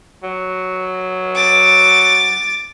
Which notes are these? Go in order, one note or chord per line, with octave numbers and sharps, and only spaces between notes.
F#3
D6 A6